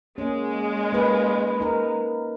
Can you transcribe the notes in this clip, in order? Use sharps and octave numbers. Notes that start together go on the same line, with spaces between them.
G#3 A#3 C#4
A#3 D#4 B4
D#4 A#4